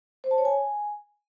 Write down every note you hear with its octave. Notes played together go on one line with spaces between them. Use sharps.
C5
A5
C#5
G#5